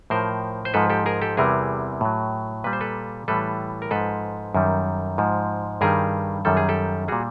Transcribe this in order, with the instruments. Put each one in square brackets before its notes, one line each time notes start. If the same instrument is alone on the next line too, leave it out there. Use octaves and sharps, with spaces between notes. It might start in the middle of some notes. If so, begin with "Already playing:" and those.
[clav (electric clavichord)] A2 F3 A#4 C5
C5
G#2 F3 A4 B4
G4 A4
G#4 A#4
G4 A4
E2 C3 E3 G3 G#4 A#4
A2 F#3
A#2 G3 B4
C5
A4 B4
A2 E3 G3 A4 B4
A#4
G#2 F3 A4 B4
F#2 D#3 G3
G#2 F3
G2 D#3 G3 G#4 A#4
F#2 D#3 G3 A4
G#4
G4 A4
A#2 G3 F#4 G#4